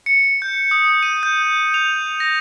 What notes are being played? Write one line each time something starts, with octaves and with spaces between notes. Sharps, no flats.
C#7
G6
D#6
D#7
G6
F7
A#6